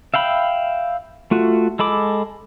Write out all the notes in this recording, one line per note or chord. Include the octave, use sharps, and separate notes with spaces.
E5 F5 G5 B5
A3 F4 F#4
G#3 A4 B5 D6